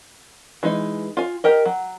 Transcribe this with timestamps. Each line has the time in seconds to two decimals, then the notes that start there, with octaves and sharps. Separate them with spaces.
0.63 E3 G#3 D#4
1.17 F4 G#5
1.44 G4 A#4 D#5
1.65 F#3